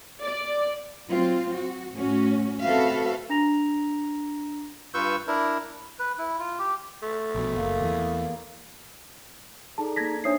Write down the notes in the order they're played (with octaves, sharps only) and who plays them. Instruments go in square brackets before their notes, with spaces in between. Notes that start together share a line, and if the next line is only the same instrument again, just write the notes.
[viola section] D5
[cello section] F#3 C4 F4
F#4
A2 C#4 F#4
C4 F#4 A4 B4 E5 F5
[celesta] D4 A#5 A#6 F7
[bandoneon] G2 F4 B4 C#6 E6 G6
D4 E4 A#4
[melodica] B4
E4
F4
G4
[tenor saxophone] A3
[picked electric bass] A#1 B2
[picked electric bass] F#1 [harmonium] A#3
[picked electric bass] E2 E3
[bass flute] D#4 [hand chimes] G#4 A4 D5 [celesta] A5
[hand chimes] A#3 A5 [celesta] G#6 A#6 B6
[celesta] D4 D#6 C7 [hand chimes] D#4 C5 E5 [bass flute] C#5